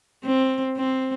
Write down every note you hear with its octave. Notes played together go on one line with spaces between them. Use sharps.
C4
C4